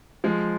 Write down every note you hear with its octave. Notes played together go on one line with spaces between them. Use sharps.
F3 G#3